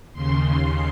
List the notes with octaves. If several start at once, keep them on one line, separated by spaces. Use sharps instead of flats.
D#2 C#3 C6